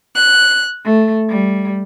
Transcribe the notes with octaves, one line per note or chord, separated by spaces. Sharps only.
F#6
A3
G3